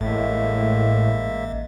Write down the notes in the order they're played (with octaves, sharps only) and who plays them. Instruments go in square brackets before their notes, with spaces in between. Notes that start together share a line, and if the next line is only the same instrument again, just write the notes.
[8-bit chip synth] A1 [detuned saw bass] A2 [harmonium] G#3 A#3 E5